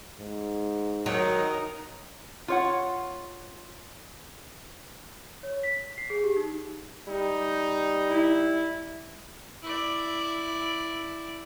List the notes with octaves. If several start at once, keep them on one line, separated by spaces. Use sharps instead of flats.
G#2
D#3 F#3 D#4 A#4
F4 C#5 F#5
C#5
B6
C7
G#4
G4
D#4
G3 D#4
E4
E4 D5